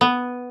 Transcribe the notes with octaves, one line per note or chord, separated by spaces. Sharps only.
B3